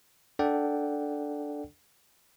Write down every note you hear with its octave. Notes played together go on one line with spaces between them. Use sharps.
D4 A4 D5 F#5 G5